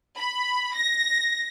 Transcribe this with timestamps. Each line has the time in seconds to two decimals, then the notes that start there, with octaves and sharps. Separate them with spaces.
0.18 B5
0.74 A#6